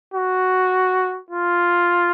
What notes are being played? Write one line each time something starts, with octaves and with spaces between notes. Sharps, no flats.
F#4
F4